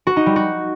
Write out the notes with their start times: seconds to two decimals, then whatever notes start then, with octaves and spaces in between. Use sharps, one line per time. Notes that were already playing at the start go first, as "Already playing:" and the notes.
0.07 F#4
0.16 D#4
0.26 G3
0.36 F#4